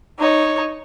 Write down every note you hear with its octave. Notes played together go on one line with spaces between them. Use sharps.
D#4 C#5